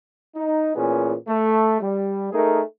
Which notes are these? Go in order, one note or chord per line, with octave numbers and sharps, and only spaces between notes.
D#4
A#2 E3 B3 C#4 G#4
A3
G3
A3 D#4 G#4 A#4